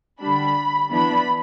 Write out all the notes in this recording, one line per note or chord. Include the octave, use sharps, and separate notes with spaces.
D3 G3 D4 B5
E3 B3 D4 B5